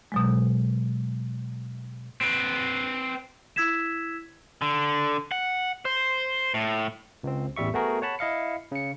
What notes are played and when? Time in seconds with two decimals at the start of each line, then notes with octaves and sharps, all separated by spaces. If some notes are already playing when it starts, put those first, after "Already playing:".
0.12 B2 F#3 G#3
2.21 C4 B4
3.56 E4 E6 G#6 B6 E7
4.62 D3
5.32 F#5
5.85 C5
6.54 A2
7.23 C#2 C4
7.56 A1 E2 G3 E5 C#6
7.74 A3 B3 F#4 G#4 A#4
8.02 C#5 F#5 A5 B5
8.19 E4 D#5 F5 C#7
8.72 C#3 C#7